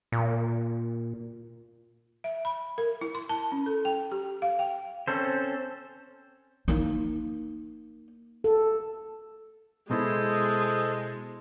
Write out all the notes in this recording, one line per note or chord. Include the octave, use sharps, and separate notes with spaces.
A#2
E5
B5
A#4
E4
C6
A5
C#4
A4
G5
G4
F5
G5
C4 C#4 A4 C5
A#3 D#4
A4
B2 G#3 E4 A4 C5 D#5